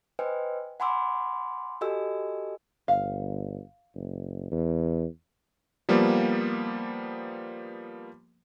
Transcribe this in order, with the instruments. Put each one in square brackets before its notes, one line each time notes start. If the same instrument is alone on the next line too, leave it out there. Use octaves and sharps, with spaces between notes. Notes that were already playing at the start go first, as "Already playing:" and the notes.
[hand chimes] B4 C5 D#5 G5 G#5
F#5 G#5 B5 C6 D6 E6
F#4 G4 A4 D#5 G#5 E6
[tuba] G1 [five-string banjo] F5
[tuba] F#1
E2
[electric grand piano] F3 G3 A#3 B3